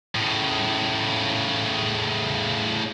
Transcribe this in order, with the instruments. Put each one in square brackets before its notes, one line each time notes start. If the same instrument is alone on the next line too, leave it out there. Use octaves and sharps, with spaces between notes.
[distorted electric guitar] A2 C#3